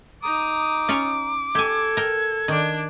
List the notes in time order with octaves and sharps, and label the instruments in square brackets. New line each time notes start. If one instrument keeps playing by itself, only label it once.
[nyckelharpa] D#4 D#6 [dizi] A#5 [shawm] D6
[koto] C#4 F4 C#5
[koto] G4 G#5 [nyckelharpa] A4 [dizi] G#6
[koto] A#4 G5
[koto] D#3 [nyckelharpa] D4 D5